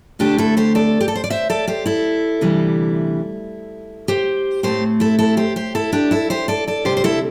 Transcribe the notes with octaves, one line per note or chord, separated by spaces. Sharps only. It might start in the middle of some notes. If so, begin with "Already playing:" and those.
D2 D3 A3 C4 D4 G4
E4 A4
G4 C5
A4 D5
G4
A4
C5
D5
C5 E5
A4 D5
G4 C5
E4 A4
D2 C3 E3 G3
G4 C5
A2 A3 C4 G4 C5
E4 A4
E4 A4
G4 C5
G4 C5
E4 A4
D4 G4
E4 A4
G4 C5
A4 D5
A4 D5
D2 C3 G3 C4 G4 C5
C5
E4 A4